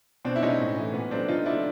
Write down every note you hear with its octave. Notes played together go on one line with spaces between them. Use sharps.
B2 C4 D4
E4
G#3 C#4 D#4
A2
E3 A3
A#2 B3
F#3 A3 C4 D4
D3 D#4 F4
F#3 A3 D4 E4